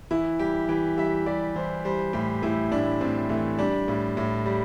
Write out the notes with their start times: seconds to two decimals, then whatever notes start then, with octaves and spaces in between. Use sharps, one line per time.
0.11 E3 E4
0.39 G3 G4
0.69 E3 G4
0.97 G3 E5
1.26 G3 D5
1.56 E3 C5
1.85 G3 C5
2.13 A2 G4
2.42 A2 E4
2.71 A2 D4
3.01 A2 C4
3.29 E3 A3
3.59 G3 D4
3.88 A2
4.17 A2
4.46 G3